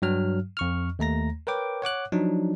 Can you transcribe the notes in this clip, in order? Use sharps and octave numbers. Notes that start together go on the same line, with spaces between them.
G2 F#3 F6
F2 C#6 F6
D#2 A3 A#5 A#6
A#4 B4 C#5 G5 D6
C#5 F#5 D6 F#6
F3 F#3 D4 D#4